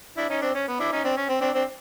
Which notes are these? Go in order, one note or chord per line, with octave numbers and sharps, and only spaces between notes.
D4 E4
C#4 D#4
C4 D4
C#4
B3
D4 E4
C#4 D#4
C4 D4
C#4
C4
C4 D4
C4 D4